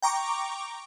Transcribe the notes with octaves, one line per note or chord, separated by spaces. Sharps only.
G5 A#5 C#6 D6